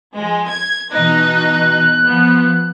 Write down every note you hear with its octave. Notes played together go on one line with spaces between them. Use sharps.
F3 G#3
G#6
B2 E3 D#4 F#6
F3 B3